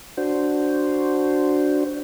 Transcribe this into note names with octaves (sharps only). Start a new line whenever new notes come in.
D4 F#4 C5